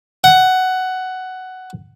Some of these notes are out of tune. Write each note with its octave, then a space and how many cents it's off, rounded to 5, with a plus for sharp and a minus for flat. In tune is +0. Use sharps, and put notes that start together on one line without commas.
F#5 +10